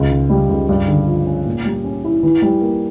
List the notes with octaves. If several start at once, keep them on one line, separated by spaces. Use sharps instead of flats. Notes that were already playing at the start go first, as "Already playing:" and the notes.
Already playing: C#2
C#3
G3
C#2
G2
D3
F3
C#4
A#2
G3
C#4
E4
E3
G3
A#3